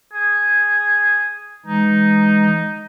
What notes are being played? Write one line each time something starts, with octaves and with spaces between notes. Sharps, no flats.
G#4
E3 G#3 D#4